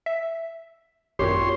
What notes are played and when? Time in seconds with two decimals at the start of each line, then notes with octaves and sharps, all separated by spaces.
0.06 E5
1.19 G#1 F#2 A#2 G4 C#5 C6